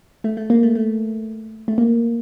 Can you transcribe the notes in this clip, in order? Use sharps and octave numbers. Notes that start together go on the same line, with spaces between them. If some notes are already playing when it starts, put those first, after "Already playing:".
A3
A3
A#3
A3
A3
A3
A#3